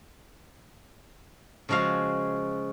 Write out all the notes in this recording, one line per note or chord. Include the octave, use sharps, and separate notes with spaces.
C#3 F3 G#3 F#4 F5